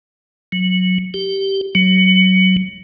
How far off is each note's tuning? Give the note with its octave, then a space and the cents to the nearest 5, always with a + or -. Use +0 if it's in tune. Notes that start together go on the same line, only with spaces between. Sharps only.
F#3 -10
G4 -10
F#3 +20